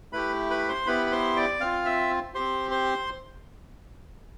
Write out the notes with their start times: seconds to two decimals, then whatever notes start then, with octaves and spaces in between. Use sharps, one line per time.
0.13 A3 E4 G4 B4 B5
0.50 B4 B5
0.68 C5 C6
0.86 B3 E4 G4 B4 B5
1.06 B5
1.12 C5 C6
1.36 D5 D6
1.60 C4 F4 F5 F6
1.85 E5 E6
2.34 C4 G4 C5 C6
2.71 C5 C6